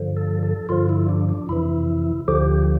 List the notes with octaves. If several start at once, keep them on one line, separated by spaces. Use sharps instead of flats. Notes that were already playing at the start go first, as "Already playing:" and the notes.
Already playing: G2 D3 F3
A4
A4
G2 D3 F3 F4
E4
D4
D4
F2 C3 E3 E4
D2 D3 F3 G4